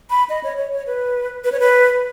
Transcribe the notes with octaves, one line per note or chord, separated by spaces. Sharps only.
B5
D#5
C#5
C#5
C#5
B4
B4
C#5
B4